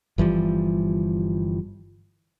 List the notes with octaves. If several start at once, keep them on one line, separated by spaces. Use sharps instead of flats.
G1 E3 F3 G3